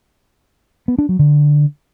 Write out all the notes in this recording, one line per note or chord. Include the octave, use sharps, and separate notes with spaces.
B3
D4
F#3
D3